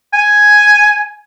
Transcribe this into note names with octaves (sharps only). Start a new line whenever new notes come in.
G#5